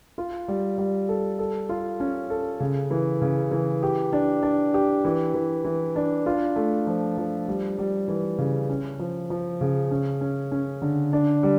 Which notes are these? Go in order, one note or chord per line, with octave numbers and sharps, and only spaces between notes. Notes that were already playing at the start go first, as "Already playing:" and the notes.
F4
G3
G3
A4
A4
F4
C#4
A4
C#3
E3
C#3
E3
G4
D4
D4
G4
E3
E3
E3
D4
F4
A3
F3
F3
G3
G3
E3
C#3
C#4
F3
F3
C#3
C#4
C#4
C#4
D3
D4
G3